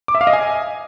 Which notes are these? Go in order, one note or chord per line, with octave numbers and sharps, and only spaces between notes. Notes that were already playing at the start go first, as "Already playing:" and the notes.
D6
E5
F5
D#5
G#5